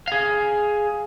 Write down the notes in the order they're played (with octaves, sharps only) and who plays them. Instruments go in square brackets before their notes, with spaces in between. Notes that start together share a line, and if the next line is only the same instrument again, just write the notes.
[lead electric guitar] G#4 F5